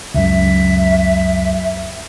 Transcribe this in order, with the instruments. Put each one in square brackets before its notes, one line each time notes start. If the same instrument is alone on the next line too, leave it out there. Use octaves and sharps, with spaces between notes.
[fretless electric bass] C#2 F#2 [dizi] E5